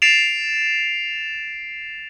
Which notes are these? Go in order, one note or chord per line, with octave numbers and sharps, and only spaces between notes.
A6 C7 D7 E7 F7